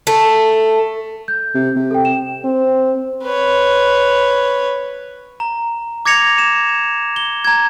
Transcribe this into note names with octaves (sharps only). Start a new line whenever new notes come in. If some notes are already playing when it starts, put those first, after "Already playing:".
A3
G6
C3
C3
A4 G5
E7
C4
B4 C#5
A#5
D6 G#6 A#6 C#7 F7
E7
G7
A#5 G#6